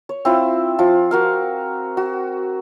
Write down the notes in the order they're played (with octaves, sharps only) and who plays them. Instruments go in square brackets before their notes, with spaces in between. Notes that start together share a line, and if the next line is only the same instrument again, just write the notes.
[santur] C#5
C4 E4 F4
F3 F4
F#4 A#4 F5
F#4